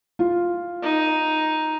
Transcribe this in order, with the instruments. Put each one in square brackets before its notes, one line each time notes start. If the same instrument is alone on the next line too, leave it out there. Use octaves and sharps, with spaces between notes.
[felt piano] F4
[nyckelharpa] D#4